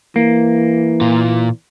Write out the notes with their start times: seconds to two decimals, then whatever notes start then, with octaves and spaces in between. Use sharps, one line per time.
0.16 E3 A#3
1.01 A#2 F4